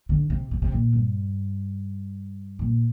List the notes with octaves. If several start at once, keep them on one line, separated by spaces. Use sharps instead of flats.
D3
C3
C3
C3
A#2
G2
A#2